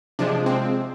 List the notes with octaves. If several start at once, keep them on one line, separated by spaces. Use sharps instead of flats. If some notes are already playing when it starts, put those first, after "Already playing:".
C3 F3 G#3 D4
C4